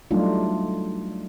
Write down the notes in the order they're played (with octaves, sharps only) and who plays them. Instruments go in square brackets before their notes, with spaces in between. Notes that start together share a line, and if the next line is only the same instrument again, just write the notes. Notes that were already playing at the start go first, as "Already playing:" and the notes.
[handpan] F#3 G3 A3 D4 D#4 F4